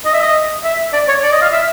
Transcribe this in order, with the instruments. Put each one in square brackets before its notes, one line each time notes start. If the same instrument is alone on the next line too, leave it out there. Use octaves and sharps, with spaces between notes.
[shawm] D#5
E5
D#5
E5
D5
C#5
D5
D#5
F5
E5